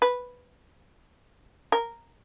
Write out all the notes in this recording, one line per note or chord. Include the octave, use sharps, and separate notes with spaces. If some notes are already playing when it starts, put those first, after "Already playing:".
B4
A#4